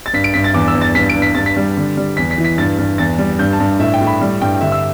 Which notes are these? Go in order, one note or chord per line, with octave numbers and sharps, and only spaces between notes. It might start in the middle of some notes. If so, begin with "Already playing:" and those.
A6
G2 B6
D7
G2 B6
A6
E2 D6
E6
E2
A6
G2 B6
D7
G2
B6
G2 A6
B6
G3
D3
G3
E2 B6
B6
E3
B6
G2 A6
G2
E2 A6
G3
G2 G6
A5
G2
A2 E5
G5
A2
B5
G3
G2 G5
G5
D3 E5
E6